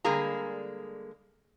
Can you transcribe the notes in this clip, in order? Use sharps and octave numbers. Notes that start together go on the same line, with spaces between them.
D3 G3 G#3 A#3 G#4 A#5